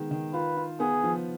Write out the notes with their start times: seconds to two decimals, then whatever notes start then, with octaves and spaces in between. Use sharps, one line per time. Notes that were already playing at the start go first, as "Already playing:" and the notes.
Already playing: D#3 G#3 B3
0.11 D#3
0.33 F4 B4
0.57 F4
0.80 B3 G#4
1.04 F3